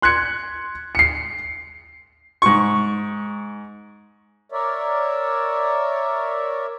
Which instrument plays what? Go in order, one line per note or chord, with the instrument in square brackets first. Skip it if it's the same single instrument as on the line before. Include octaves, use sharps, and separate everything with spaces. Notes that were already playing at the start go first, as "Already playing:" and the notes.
[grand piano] C6 F#6 G#6 C#7
C7 C#7
[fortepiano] G#2 C#6
[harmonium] A#4 C#5 D5 E5